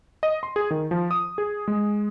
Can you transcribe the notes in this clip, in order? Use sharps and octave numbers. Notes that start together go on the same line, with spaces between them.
D#5
C6
G#4
D#3
F3
D#6
G#4
G#3